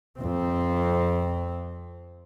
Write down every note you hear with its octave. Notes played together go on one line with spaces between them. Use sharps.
F2 C4